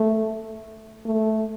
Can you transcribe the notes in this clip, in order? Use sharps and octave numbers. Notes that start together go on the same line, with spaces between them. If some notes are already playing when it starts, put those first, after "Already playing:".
Already playing: A3
A3